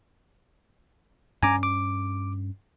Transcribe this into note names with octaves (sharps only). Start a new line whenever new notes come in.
G2 C#4 G#5 A#5 D6
D6